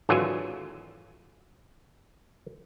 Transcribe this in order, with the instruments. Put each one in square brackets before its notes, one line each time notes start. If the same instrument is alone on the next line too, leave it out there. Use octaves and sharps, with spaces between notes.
[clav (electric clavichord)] G#1 D3 E3 F#3 F4 G#5